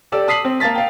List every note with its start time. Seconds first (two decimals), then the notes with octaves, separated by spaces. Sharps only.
0.12 G4 A4 D5 E6
0.28 A5 D#6 B6 C7 F#7
0.45 C4
0.60 A#3 F5 A5 A6 B6
0.75 F5 G5